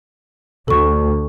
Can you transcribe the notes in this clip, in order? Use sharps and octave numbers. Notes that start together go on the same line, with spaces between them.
D2 A4 C#6